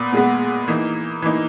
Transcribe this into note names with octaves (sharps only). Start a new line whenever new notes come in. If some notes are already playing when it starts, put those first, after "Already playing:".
Already playing: A#2 B3
A#2 G#3 B3
E3 A#3 D#4
E3 A#3 D#4